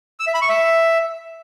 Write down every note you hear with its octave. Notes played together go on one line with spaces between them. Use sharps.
E6
E5
B5
C#6
E5